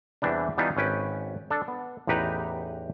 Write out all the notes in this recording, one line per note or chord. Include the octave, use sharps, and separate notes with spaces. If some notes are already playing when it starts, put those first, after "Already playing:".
E2 C3 E3 G3 D4
E3 G3 B3 D4 D#4 F4
G#1 C#4 B4 G5
D4 A4
B3
A1 E2 D#4 G4 B4 A#5